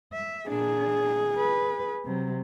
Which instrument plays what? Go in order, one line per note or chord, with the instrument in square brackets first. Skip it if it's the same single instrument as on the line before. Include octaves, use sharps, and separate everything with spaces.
[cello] E5
[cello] A#2 D4 [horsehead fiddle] G#4
[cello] B4
C3 F#3